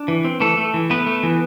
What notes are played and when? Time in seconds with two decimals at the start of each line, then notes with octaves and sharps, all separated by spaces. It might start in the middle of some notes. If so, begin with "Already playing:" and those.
Already playing: D4
0.08 E3
0.24 C4
0.40 E3 A3 A4
0.57 A3
0.74 E3
0.90 A3 B3 B4
1.07 A3
1.23 E3